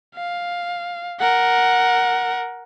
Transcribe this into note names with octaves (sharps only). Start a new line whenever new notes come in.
F5
A#4 F#5